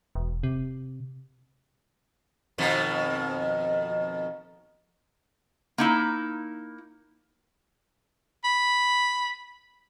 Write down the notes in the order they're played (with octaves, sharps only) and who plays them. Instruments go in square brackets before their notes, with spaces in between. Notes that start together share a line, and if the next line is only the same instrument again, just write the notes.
[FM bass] E1
C3
[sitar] F2 B2 D#3
[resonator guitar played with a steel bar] A#3 D#4 E4
[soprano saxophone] B5